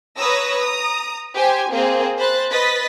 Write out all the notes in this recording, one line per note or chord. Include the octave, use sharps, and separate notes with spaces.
B4 C#5 A#5 D#6 E6 A#6
A#5 D#6
G4 C5 G5 G#5
A#3 C4 G#4 C5
C5 B5 F#6 A6
B4 D#5 A6 B6